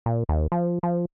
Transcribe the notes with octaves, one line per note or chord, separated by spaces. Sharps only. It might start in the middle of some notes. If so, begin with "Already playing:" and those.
A#2
D#2
F3
F3